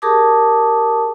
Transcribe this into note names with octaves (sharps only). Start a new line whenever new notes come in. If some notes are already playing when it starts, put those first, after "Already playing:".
G4 G#4 A#4 A5 D6 D#6